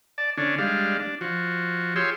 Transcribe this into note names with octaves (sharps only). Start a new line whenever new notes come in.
D5 A5
D3 C#4 D4
G3 G#3 D4 F5
D4
F3 F#4
F4 G4 G#4 C#5 C6 E6